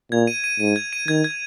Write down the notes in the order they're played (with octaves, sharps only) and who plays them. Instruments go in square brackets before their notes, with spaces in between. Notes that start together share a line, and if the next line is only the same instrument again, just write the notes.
[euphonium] A#2 [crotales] G#6
[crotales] D#7
D#7
[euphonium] G#2 [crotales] D#7
[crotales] G#6
D#7
[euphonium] D#3 [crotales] G#6
[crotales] G#6